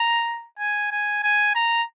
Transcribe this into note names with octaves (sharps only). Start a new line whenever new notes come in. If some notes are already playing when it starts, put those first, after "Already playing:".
Already playing: A#5
G#5
G#5
G#5
A#5